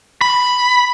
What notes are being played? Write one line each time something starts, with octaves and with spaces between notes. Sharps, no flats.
B5